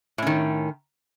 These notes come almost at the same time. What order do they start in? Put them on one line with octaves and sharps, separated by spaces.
A2 C#4 D#3